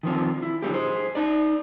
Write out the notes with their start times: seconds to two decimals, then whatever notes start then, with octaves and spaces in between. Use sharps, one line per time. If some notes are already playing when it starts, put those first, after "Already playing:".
0.03 D#3 F3 C4
0.42 E4
0.62 D3 F#3 A#3 G4
0.74 G#4 C5
1.15 D#4 D5